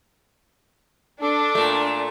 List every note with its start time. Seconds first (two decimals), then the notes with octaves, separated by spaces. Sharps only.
1.22 D4 A4 D6
1.55 A#2 A3